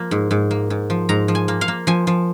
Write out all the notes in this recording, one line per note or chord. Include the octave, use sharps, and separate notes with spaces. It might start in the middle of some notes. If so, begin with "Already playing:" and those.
Already playing: F3 A#3
G#2
G#2
A#3
G#2
F3
G#2 A#5
F3
G#5
A#3
F5
A#3
F3 G#5
F3